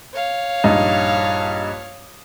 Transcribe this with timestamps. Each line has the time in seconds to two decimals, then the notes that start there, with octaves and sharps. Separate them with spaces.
0.14 C#5 F5
0.64 A#1 G2 D#4